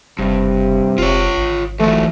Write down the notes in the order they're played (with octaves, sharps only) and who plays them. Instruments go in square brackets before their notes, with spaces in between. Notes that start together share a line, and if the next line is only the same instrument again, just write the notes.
[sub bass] F#1 [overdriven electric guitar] G2 [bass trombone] C3
[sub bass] F1 [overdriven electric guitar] F4 C#5
[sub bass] G#1
[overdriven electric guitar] E3 F#3 [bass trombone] A3